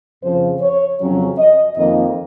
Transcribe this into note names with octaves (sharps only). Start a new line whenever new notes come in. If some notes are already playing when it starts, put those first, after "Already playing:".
F2 C#3 F3 C5
C#5
F2 C#3 F#3 C#4
D#5
F2 D#3 A#3 D#5